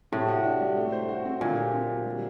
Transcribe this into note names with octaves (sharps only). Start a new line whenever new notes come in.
A2 C3
F#4
D4
G3
A3
C5
F#4
C4
A#2 D3
G4
C4
F#3
G3